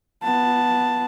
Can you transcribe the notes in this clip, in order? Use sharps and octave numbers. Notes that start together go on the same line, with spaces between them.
B3 A5